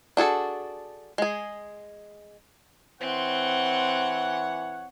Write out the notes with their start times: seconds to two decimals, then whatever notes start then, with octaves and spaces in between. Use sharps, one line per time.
0.17 D4 F#4 G#4 A4
1.18 G#3 G#4
3.01 E3 C4 C#5 F#5 C6